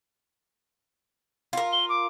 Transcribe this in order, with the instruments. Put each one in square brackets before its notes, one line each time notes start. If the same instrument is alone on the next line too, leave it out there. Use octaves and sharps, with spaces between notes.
[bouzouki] F4 A#4
[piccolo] G7
D6